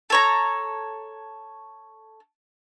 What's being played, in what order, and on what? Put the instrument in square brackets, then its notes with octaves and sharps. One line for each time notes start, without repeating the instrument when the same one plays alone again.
[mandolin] A4 C#5 A#5